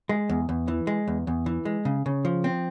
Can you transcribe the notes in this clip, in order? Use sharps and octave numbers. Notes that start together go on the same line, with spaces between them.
G#3
E2
E2
E3
G#3
E2
E2
E3
G#3
C#3
C#3
F3
C4